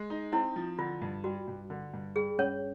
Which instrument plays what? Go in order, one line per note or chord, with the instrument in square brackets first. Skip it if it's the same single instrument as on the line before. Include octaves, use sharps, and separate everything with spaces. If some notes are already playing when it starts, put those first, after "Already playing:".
Already playing: [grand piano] G#3
D#4
[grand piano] C4 [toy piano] E4
[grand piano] F3
[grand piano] D3 [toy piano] F4
[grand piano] G2
[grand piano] G3 [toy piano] F#4
[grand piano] G2
D3
G2
[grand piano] G3 [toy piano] G#4
[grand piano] G2 [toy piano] C#4 C#5